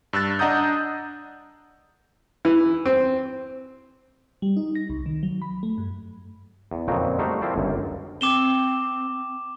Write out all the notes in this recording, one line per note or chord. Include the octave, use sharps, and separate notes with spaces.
G2 E6 F#6 A6
D4 D#5 F#5 A#5 D#6 G6
E3
C4
G3
D#4
A#6
C2
D#3
F#3
B5
A3
G2
E2
F2 A#2 C#3 F#3 C4 D#4
G3 A3 D#4 F#4 A#4 C5
F3 A#3 C4 E4 C5 D5
G1 C#2 F#2
C4 D6 E7 G7